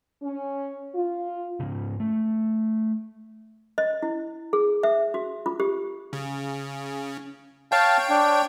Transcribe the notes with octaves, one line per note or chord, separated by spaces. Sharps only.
C#4
F4
G#2 C#3
A3
D#5
E4
G#4
E5
F#4
F4
G4
C#3
C#5 F5 G5 A5
D4